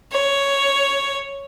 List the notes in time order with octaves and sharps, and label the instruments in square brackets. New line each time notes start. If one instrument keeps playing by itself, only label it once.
[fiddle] C#5